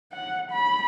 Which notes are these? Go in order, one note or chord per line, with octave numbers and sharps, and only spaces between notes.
F#5
B5